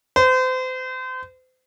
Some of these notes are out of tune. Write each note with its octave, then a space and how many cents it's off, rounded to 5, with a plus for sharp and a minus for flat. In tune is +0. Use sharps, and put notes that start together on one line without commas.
C5 -35